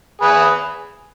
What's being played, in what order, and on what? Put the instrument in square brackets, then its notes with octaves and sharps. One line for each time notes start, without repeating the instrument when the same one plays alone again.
[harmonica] G#4 B4